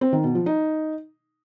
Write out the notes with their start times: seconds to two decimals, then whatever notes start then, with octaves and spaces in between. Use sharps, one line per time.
0.01 C4
0.13 D#3
0.24 B2
0.35 F3
0.46 D#4